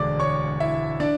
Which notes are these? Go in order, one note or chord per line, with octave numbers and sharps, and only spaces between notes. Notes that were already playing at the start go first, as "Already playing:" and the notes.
Already playing: E1 D2 D3 G#3 D5 D6
C#5 C#6
E4 E5
D4 D5